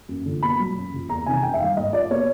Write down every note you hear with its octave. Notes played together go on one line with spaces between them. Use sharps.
F#2
D3 F3
B2 B5
F#3
F#2
C#3 F3
E2 A#5
C3 D#3 G#5
F#2 G5
E5
D#3 G3 F5
G#2 D#5
F3 D5
B2 C#5